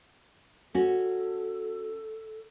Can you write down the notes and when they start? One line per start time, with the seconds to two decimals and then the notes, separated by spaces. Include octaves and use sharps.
0.75 C#4 F#4 A4